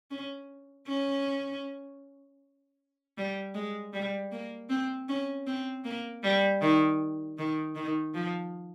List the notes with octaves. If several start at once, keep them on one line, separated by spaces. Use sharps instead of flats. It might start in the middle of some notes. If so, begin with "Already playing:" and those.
C#4
C#4
G3
G#3
G3
A#3
C4
C#4
C4
A#3
G3
D#3
D#3
D#3
F3